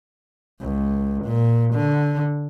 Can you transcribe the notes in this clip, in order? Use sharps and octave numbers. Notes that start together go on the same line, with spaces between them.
C#2
A#2
D3